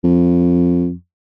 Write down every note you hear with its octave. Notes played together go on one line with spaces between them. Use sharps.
F2